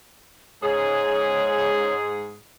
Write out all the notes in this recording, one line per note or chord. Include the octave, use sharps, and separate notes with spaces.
G#2 G#4 C#5